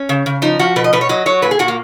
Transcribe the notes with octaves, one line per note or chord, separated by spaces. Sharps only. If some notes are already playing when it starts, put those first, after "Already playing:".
Already playing: C#4
C#3
C#3
F3 D#4
F3 F#4
B2 B4
D#5
B2 B4
C#5
F#3 D#5
F#3 C#5
A#2 B4
G#4
A#2 F#4
A#3